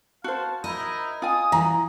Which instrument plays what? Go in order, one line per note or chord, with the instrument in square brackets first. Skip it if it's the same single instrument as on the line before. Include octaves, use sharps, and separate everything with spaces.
[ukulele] F#4 C5 [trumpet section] F5 A5
[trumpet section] D#4 E4 A#4 [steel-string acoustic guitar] D#5
[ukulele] F4 G#5 [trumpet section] D#6
[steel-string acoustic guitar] E3 [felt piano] A#5